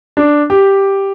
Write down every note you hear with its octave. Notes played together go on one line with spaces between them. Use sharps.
D4
G4